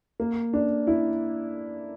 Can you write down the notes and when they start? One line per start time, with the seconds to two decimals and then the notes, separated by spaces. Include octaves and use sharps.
0.20 A#3
0.53 D4
0.87 E4